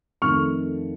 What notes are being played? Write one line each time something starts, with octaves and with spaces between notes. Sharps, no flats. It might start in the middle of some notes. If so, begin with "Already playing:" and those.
F2 D#3 A3 C#6 F6